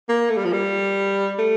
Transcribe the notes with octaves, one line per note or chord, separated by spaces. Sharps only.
A#3
A3
G3
F3
G3
A3